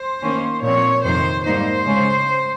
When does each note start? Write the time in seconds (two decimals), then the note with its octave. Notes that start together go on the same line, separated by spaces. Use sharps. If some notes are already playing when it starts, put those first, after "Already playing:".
Already playing: C5
0.22 D#3 A#3 C#4
0.63 A#2 F3 C4 C#5
1.04 F2 C3 D#3 C5
1.45 G#2 G3 A#3 D#4 C5
1.85 C#3 G#3 C#4